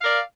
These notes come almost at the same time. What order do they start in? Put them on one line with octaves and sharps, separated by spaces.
F5 A#4 D5